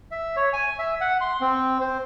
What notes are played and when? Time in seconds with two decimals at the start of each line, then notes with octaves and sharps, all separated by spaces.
0.11 E5
0.36 C#5
0.53 G#5
0.79 E5
1.01 F#5
1.21 C6
1.41 C4
1.81 C5